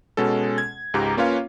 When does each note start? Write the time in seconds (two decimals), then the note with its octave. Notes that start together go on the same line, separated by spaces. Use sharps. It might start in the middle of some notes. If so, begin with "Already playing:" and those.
0.17 B2 G#3 C#4 A4
0.58 G#6
0.94 C#2 G#2 G4 A#5
1.17 A#3 C#4 F4 B4 C#5 F5